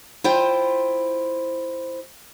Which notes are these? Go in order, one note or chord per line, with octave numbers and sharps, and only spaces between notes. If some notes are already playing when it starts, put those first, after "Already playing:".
E4 F4 C5 G5